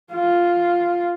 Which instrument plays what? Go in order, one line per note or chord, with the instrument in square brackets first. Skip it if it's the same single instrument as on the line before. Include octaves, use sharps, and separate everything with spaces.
[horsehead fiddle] F4